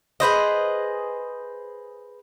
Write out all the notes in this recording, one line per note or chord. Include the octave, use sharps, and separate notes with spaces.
G#4 B4 C5 D#5